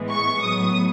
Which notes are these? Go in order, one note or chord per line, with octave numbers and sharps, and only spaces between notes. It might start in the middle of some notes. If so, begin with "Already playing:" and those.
Already playing: A2 E3 G#3 B3
C#6
A2 F#3 B3 D#6